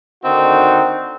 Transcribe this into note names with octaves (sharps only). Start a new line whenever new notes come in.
D3 D#3 C4 D#4 F#4